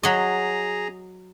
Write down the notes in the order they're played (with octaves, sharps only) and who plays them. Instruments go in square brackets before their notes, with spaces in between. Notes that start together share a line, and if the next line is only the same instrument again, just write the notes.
[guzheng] F#3 D#5 [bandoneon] G#4 A#5